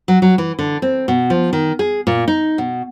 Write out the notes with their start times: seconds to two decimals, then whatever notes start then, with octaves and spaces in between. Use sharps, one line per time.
0.08 F#3
0.22 F#3
0.38 E3
0.59 D3
0.82 C4
1.08 B2
1.30 F3
1.53 D#3
1.79 G#4
2.07 A#2
2.28 D#4
2.58 B2